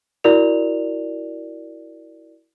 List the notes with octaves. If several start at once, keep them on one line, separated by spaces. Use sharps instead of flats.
E4 F#4 A#4 D5 F7